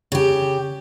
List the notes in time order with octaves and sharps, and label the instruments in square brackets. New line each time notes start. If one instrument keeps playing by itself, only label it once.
[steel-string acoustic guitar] C#3 G4